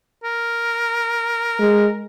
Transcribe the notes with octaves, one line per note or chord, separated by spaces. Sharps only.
A#4
G#3